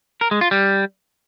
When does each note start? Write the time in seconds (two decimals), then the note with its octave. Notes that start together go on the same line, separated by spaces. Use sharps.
0.21 A#4
0.31 G#3
0.41 F4
0.51 G3